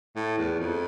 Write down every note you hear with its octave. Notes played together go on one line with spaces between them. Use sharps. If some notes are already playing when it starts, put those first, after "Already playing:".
A2
E2
F2